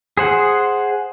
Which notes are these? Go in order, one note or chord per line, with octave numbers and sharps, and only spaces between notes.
G#4 C5 F#5